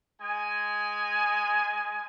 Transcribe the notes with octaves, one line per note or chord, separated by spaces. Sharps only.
G#3 G#5